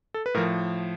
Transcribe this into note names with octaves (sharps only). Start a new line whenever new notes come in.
A4
B4
A2 F3 A#4